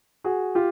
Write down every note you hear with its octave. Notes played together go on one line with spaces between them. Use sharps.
F#4 G#4
F4 G4